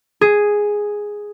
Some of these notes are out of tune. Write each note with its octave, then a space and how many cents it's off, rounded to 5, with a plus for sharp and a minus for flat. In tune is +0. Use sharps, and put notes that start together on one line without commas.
G#4 +0